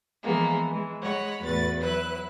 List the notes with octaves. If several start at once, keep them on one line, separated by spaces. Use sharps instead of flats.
E3 F3 G#3 A#3 B3
E3 G#3
G#3 C#5 F#5 B5
E2 A2 F#4 B4 A6
F#3 E4 B4 F#6